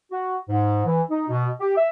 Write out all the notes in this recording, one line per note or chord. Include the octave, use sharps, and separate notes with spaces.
F#4
G#2
E3
D#4
B2
G4
E5